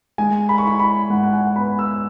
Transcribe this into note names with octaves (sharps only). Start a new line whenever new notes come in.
G#3 G#5
B5
C#6
E4 B5
B5
G#2 F#5
F#5
G#5
B3 B5
E6